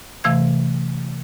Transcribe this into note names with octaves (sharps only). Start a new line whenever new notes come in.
C3 E3 A3 F5 G#6